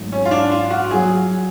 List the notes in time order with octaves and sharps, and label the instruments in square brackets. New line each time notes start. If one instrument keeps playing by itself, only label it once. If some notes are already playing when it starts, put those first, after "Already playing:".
Already playing: [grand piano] G#1 G#2 F#3 A3
[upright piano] C#4
F4
D4
F4
F#4
[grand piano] F#3 [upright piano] G#4